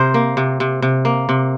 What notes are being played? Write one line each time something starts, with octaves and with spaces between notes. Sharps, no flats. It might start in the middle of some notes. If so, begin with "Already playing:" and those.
Already playing: C3 A#4 C5
A#3
C3
C3
C3
A#3
C3